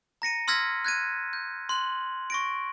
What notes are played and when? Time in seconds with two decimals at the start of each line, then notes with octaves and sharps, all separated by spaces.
0.22 A#5 A#6 C#7 D#7
0.48 C6 E6 F6 G#6 A#6 B6
0.85 F#6 G#6 A6 D#7
1.33 G6
1.69 C6 F#6 F#7
2.30 C#6 A#6 D7